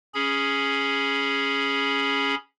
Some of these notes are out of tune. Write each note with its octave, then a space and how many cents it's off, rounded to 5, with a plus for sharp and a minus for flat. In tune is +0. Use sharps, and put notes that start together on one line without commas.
C#4 +0 G#4 +0 B5 -20